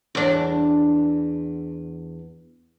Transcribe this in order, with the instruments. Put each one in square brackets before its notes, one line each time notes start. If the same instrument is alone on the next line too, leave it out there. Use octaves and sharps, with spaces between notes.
[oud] E2 D4